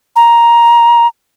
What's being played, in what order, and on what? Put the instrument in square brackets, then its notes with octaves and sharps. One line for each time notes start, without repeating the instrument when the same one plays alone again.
[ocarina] A#5